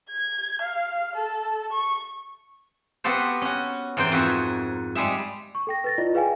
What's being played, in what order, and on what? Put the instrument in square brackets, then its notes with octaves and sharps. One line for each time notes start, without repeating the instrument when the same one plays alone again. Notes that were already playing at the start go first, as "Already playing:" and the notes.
[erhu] G#6
F5
A4
C#6
[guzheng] B3 F#4 G4 A4 C5
C#4 F#4
G#2 E3 A#4 C5 G5
F2 F#4 E5 G#5
G3 G#3 G#4 E5
[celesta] C#6
A4 G5 A#6
B4 A6 A#6
E4 F4 D5 D#5
G#4 B4 F5 G5 G#5